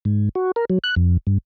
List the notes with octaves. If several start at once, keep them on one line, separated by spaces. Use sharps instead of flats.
G#2
F#4
A#4
F#3
F#6
F2
G2